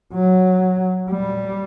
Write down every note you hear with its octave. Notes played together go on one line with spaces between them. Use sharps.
F#3
G3